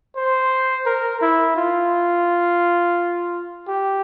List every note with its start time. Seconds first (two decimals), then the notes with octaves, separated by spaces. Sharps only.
0.16 C5
0.86 A#4
1.21 E4
1.56 F4
3.68 G4